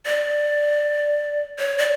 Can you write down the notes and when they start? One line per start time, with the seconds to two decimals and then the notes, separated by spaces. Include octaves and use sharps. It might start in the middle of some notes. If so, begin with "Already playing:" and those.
0.06 D5
1.59 C#5
1.78 D5